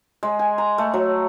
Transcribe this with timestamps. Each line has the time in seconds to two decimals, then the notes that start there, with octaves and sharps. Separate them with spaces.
0.23 G#3
0.39 G#5
0.58 A#5
0.78 A3
0.94 F#3